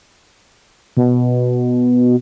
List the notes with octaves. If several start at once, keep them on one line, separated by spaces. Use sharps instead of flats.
B2